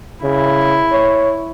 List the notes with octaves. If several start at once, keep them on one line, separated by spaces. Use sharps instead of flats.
C#3 E4
C#5